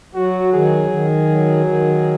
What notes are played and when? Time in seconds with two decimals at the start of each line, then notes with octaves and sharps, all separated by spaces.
0.15 F#3 F#4
0.53 D#3 G#4
0.91 D#3
1.28 F#3
1.66 D#3